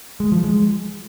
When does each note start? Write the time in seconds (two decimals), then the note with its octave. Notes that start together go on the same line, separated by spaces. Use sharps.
0.20 G#3
0.32 F3
0.44 G#3